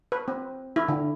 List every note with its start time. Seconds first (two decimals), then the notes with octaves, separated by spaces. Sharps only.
0.12 B4
0.28 C4
0.76 E4
0.88 D3